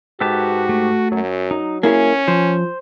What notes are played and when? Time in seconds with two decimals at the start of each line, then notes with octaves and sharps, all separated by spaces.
0.20 G#2 F#4 G4 A4 B4 A5
0.69 A3
1.12 F#2 F#3
1.51 D#4
1.83 A#3 C#4 E4 G#4 G#5
2.28 F3 C5